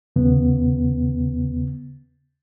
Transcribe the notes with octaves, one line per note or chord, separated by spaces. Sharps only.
D#2 C#3 B3